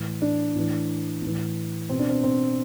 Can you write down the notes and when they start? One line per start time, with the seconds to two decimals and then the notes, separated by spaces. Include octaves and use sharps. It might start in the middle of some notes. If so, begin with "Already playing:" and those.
Already playing: A2 E3
0.22 D4
0.56 A2 E3
1.22 A2 E3
1.89 B2 C4
1.99 D4
2.09 C4
2.23 C4